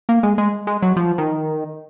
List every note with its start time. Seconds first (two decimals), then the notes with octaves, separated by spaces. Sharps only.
0.09 A#3
0.23 G#3
0.38 G#3
0.67 G#3
0.82 F#3
0.96 F3
1.18 D#3